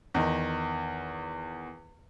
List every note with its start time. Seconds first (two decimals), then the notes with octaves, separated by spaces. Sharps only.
0.14 E2 D#3